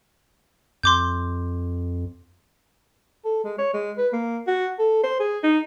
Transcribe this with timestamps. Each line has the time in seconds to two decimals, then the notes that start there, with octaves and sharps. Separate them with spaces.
0.83 F2 C6 D6 G6
3.25 A4
3.44 G#3
3.58 C#5
3.74 G#3
3.98 B4
4.13 A#3
4.47 F#4
4.79 A4
5.04 C5
5.20 G#4
5.43 D#4